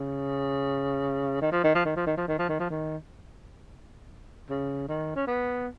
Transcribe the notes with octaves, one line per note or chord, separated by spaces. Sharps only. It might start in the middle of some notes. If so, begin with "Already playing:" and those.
Already playing: C#3
D#3
F3
D#3
F3
D#3
F3
D#3
F3
D#3
F3
D#3
F3
D#3
C#3
D#3
C#4
B3